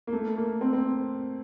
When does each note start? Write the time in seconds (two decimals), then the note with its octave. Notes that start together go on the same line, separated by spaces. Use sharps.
0.07 A#3
0.13 A3
0.37 A#3
0.61 C4
0.73 C4